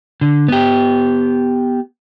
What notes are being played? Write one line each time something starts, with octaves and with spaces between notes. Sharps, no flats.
D3
B3 G4